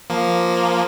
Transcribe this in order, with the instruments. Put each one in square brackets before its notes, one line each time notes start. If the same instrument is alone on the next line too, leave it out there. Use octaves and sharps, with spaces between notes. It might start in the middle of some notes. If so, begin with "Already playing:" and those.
[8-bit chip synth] F3 A#3